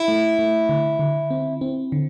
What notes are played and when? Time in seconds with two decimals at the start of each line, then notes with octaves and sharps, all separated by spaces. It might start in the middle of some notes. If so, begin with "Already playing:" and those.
Already playing: E4
0.08 A3
0.39 A3
0.69 D3
0.99 D3
1.30 C4
1.61 C4
1.92 D3